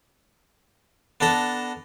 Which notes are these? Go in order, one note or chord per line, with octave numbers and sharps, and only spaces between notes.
B3 D4 A4 A#5